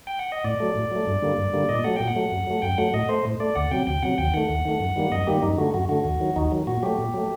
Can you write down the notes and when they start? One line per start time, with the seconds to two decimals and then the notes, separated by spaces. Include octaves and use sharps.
0.07 G5
0.19 F#5
0.32 D#5
0.44 A2 D5
0.60 F#3 A3
0.75 A2
0.91 F#3 A3
1.07 G2
1.22 D3 G3 A#3
1.38 G2
1.54 D3 G3 A#3
1.69 A#2 D#5
1.84 F#3 A3 F#5
1.96 A#2 G5
2.08 F#5
2.16 F#3 A3
2.31 F#2
2.47 F#3 A3
2.62 F#2 G5
2.78 F#3 A3 F#5
2.94 A2 D#5
3.09 A3 C5
3.25 A2
3.40 A3 D5
3.55 D2 F#5
3.71 C3 F#3 G5
3.87 D2 G5
4.03 C3 F#3 F#5
4.18 D#2 G5
4.34 D#3 A3 F#5
4.49 D#2
4.65 D#3 A3
4.80 F#2
4.96 D#3 G3 A#3
5.11 F#2 D#5
5.27 D#3 G3 A#3 G4
5.42 F#2 D#4
5.58 D3 A3 F#4
5.74 F#2 F#4
5.89 D3 A3 F#4
6.05 D#2
6.20 D#3 F#3
6.36 D#2 D#4
6.52 D#3 F#3
6.67 A#2 F#4
6.83 F#3 A3 G4
6.98 A#2
7.14 F#3 A3